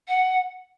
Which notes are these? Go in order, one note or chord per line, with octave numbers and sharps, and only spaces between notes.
F#5